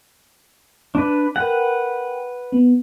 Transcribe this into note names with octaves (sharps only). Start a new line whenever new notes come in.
D4 B4
A#4 B4 F#5 G5
B3